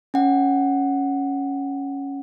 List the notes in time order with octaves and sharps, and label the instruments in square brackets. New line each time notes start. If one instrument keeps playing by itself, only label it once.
[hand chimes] C#4 F#5